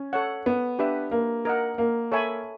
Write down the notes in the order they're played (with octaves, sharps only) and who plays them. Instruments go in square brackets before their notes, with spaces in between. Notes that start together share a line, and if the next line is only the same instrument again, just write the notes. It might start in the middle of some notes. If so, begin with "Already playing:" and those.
Already playing: [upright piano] C#4
[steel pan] A4 C#5 F#5
[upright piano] B3
[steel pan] D4 G4 B4 E5
[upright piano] A#3
[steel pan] A#4 D#5 F#5
[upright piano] A#3
[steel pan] A4 C#5 E5 G#5 B5